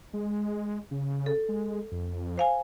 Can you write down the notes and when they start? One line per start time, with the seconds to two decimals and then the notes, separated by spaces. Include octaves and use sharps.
0.13 G#3
0.91 C#3
1.26 A4
1.49 G#3
1.92 F2
2.38 C5 F5 G#5